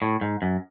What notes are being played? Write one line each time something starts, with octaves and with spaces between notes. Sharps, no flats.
A2
G#2
F#2